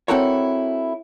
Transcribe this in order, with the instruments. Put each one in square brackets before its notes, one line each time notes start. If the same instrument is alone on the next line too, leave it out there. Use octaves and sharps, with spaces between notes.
[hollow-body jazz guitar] C4 E4 F#4 A4 A#4 C#5